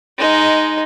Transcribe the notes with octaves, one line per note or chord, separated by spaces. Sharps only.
G#3 D#4